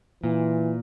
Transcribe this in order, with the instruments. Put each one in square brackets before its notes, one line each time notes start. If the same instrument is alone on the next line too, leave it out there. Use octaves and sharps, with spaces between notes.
[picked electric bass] A#2 [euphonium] E3